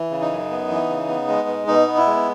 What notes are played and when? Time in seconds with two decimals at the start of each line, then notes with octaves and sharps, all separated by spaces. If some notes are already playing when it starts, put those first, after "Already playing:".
Already playing: E3
0.11 C#3
0.21 D#4
0.31 F#2
0.51 B3
0.69 E3
0.89 C#3
1.08 B3
1.28 G#3
1.48 B2
1.67 B2 D#4
1.87 B3
1.97 E4
2.06 G#3